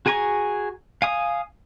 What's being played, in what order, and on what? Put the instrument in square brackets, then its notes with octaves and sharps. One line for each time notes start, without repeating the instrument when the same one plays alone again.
[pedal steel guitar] F#4 G#4 G#5 A#5 C#6
F5 G#5 D#6